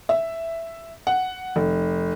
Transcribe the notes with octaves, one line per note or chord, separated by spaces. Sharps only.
E5
F#5
F1